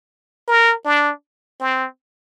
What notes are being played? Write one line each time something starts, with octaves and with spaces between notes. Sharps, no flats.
A#4
D4
C4